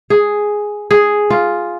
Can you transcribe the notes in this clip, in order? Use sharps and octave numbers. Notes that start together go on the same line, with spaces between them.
G#4
G#4
F4